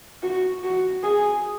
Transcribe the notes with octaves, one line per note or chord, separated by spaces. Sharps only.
F#4
F#4
G#4